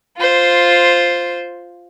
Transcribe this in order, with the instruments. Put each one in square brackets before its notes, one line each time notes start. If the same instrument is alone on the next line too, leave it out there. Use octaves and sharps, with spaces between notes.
[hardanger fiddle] F4 C5